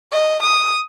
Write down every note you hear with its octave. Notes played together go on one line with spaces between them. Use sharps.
D#5
D#6